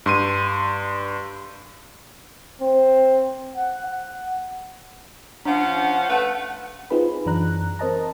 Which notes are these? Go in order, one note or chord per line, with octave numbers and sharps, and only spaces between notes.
G2 C6 D#7
C4
F#5
F#5
F3 C#4 D4 F5 F#5
A3 B4
C4 D#4 F4 G#4 B4 B5
F#2 E3 D4 A#5 F#6
C4 A#4 C5 D#5 A5 A#5